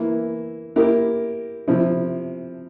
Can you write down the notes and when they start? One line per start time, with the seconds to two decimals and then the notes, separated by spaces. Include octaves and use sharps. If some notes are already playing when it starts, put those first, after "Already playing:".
Already playing: E3 A#3 E4
0.76 A#3 E4 G4 A#4
1.67 C3 F3 C4 E4